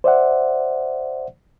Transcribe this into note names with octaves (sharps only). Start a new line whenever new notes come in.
C5 D5 E5 F#5